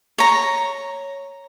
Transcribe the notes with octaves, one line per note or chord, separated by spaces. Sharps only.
C#5 A#5